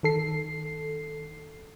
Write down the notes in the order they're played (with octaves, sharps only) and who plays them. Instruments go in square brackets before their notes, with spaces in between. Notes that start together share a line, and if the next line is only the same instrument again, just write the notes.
[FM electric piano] D#3 A4 C7